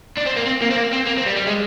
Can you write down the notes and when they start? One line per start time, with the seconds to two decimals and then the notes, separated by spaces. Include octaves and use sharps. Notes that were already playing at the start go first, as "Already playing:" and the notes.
0.18 D4
0.27 C4
0.37 A#3
0.46 C4
0.62 A#3
0.71 C4
0.77 A#3
0.92 C4
1.07 A#3
1.17 C4
1.26 G3
1.36 G3
1.47 G#3